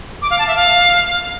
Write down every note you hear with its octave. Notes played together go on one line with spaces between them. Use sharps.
D6
F5
A5
E5
F5